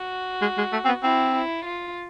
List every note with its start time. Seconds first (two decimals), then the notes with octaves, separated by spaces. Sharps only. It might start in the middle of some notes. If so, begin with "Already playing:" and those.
Already playing: F#4
0.41 G#3
0.58 G#3
0.72 A3
0.85 C4
0.88 B3
1.03 C4 E4
1.35 E4
1.65 F4